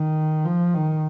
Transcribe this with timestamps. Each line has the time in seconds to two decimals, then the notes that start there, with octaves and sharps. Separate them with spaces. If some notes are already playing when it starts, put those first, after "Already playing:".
Already playing: D#3
0.45 F3
0.74 D#3